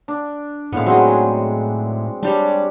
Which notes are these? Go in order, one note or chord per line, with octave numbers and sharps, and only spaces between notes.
D4
A2 G#3 B3 F5 F#5
F#3 C4 D#4 G#4
G3 D4 G4 C#5